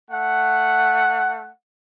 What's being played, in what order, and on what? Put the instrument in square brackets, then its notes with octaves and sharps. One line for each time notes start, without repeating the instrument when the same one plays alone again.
[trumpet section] A3 F#5